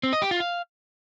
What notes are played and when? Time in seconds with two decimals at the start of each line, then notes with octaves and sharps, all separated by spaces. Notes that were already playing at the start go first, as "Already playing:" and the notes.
0.03 C4
0.13 D#5
0.22 G4
0.31 F4
0.40 F5